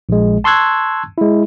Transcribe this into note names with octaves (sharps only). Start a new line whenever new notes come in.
A#1 G#3
A5 C6 C#6 E6 F#6 G#6
G#3 E4